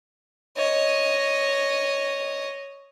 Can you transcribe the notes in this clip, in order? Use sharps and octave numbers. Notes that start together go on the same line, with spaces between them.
C#5 D#5